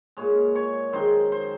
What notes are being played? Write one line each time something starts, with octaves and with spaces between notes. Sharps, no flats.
A#2 G#3 C#5
C#5
F#2 D#3 G#3 C5
C5